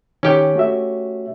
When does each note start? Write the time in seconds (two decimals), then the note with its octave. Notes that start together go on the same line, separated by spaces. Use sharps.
0.23 D#3 C#4 G4 G5
0.55 A3 F#4 E5